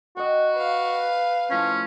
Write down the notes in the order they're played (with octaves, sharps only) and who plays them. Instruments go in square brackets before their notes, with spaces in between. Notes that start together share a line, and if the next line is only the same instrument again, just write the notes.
[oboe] F#4 [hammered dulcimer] D#5 G5
[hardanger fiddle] B4 F5
[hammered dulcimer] A2 F3 [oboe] C#4